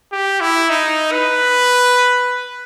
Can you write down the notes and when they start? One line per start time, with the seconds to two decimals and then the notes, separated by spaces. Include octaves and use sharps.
0.12 G4
0.41 E4
0.69 D#4
1.12 B4